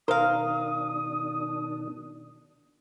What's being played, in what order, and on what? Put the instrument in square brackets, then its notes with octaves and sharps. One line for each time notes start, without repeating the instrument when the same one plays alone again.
[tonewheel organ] B2 D#3 D4 [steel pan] A#4 [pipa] C5 F5 [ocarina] D#6